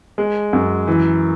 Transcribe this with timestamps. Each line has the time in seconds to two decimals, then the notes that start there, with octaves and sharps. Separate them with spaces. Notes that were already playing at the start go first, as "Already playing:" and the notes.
0.18 G#3
0.53 F#2
0.87 E3